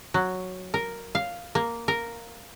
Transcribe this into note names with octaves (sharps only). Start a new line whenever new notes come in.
F#3
A#4
F5
A#3
A#4